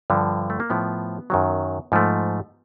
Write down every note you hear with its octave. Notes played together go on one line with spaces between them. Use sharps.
G2 D3 F3
A3
A#3
A2 F3 A3 B3
F#2 D#3 F#3
G#2 F3 A3